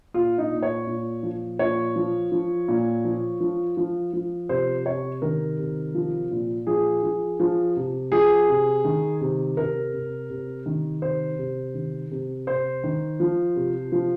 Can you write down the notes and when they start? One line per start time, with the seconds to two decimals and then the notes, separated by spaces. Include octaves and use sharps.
0.14 A#2 F4
0.38 D#4
0.51 A#2
0.63 C#5
0.87 A#2
1.23 F3
1.59 A#2 C#5
1.96 F3
2.32 F3
2.68 A#2
3.05 F3
3.40 F3
3.77 F3
4.13 F3
4.49 C3 C5
4.86 C3 C#5
5.22 D#3 A#4
5.58 C3
5.94 F3
6.31 A#2
6.67 F3 G#4
7.03 F3
7.40 F3
7.76 C3
8.12 F3 G#4
8.48 C3
8.85 D#3
9.21 C3
9.57 C3 A#4
9.93 C3
10.30 C3
10.66 D#3
11.02 C3 C5
11.38 C3
11.74 D#3
12.11 C3
12.47 C3 C5
12.84 D#3
13.20 F3
13.56 C3
13.92 F3